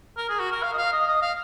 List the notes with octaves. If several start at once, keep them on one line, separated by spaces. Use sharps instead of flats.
A#4
G#4
F#4
A#4
F5
D#5
F5
D#5
D#5
F5